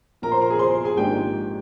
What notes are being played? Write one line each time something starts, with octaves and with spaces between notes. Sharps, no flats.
A#1 A#2 F3 A#4 A#5
C5 C6
A#4 A#5
G#4 G#5
C5 C6
G#4 G#5
G#1 G#2 F3 A#3 D4 G4 G5